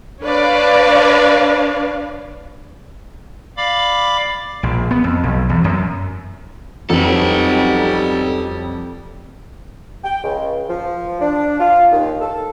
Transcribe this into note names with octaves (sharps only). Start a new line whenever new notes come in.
D4 B4 C#5 D5 F5
D5 F5 B5 D6
A#1
B3
F2
B1
E2
F#2
F2 F#3 G3 C#4 D#4 A4 B4
G5
C#2
F3
D4
F4
D#2
A4